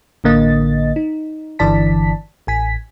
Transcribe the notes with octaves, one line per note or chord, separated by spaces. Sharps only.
A1 D3 A#3 D#5 A6
D#4
G1 D3 E3 D5 A5 B6
A1 G#5 B6